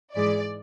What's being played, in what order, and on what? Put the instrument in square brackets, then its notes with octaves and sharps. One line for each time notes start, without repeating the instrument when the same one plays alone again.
[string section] G#2 E3 G#3 D5